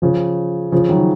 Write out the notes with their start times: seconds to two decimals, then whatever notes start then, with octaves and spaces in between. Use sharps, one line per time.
0.02 C#3 F3
0.72 C#3 F3
0.89 D#3 F#3